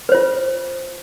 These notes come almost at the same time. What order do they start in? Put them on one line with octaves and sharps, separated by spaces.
B4 C5 F4